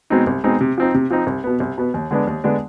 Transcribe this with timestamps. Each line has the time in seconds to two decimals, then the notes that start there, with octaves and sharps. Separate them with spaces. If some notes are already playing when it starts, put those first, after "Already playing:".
0.10 B2 G#3 C4 D#4
0.27 C2
0.44 B2 G#3 C4 D#4
0.61 C3
0.78 F3 C4 D#4
0.94 C3
1.10 F3 C4 D#4
1.27 C2
1.44 B2 B3
1.60 C2
1.78 B2 B3
1.94 D#2
2.11 D3 G#3 B3 D4
2.27 D#2
2.44 D3 G#3 B3 D4